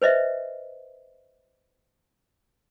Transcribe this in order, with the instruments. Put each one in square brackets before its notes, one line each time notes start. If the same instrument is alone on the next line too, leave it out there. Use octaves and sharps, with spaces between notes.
[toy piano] B4 C5 D#5 E5